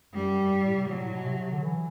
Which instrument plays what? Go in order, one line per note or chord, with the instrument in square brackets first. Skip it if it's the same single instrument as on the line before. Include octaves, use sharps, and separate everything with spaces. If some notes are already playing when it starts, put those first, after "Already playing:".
[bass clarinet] F#2 [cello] G3
[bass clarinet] G2
A2
C3
[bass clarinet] B2 [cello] F#3
[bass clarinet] A2
B2
C3
C3
D3
E3